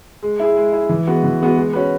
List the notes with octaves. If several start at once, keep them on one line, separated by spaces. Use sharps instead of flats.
G#3
E4 G#4
G#3
E4 G#4
E3
G#3 B3 F#4
E3
G#3 B3 F#4
G#3
C#4 F#4 B4